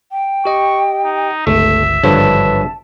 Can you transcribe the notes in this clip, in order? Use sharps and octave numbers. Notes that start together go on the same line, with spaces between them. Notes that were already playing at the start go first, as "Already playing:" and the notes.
G5
G4 D#5 C#6
D#4
G1 C#2 A3 E5
G#1 G2 D3 F3 B4 C#5 A5